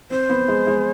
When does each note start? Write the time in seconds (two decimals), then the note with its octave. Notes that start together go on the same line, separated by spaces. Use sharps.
0.10 C4 C5
0.29 B3
0.48 G#3
0.67 G#3